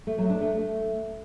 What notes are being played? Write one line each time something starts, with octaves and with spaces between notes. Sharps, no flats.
A3
F#3
D4
A3